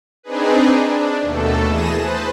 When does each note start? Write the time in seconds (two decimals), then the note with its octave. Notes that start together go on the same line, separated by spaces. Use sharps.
0.23 C4 D4 D#4 G#4 B4
0.85 D4
1.22 D#2 B2 A3 A4
1.68 E3 G#4 D#6 A#6 E7
1.97 B4 C5 A5